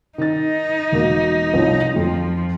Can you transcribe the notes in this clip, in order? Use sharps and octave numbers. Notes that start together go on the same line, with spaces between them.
D#3 D#4 A6
E1 A#3 F#4
C2 F3 C#5
F2 F3